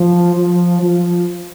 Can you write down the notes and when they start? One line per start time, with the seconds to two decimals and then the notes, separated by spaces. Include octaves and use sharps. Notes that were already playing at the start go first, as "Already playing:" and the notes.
Already playing: F3
0.35 F3
0.81 F3